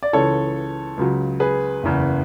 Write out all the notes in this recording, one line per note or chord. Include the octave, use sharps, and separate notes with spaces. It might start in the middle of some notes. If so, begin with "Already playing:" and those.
D5
C#2 C#3 E3 A4 C#5
C#2 C#3 F#3
G#4 B4
F#1 E2 C#3